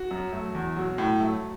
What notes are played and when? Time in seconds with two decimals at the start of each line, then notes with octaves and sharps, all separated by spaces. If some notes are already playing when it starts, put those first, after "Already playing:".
Already playing: F#4
0.11 F#2
0.33 F#3 A3
0.55 E2
0.76 B2 F#3
0.98 A2
1.20 F#3 A3